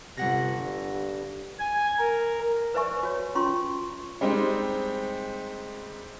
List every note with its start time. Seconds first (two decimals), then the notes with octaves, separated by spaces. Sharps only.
0.17 G1 C3 F#5 A#6
0.60 G2
1.59 G#5
1.99 A#4
2.74 B4 C5 D5 E5 G#5 C#6
3.03 F#4 C#5
3.35 C#4 F4 C6 C#6
4.21 G3 G#3 C4 D#4